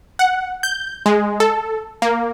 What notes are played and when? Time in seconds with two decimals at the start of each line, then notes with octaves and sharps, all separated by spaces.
0.19 F#5
0.63 G6
1.06 G#3
1.40 A4
2.02 A#3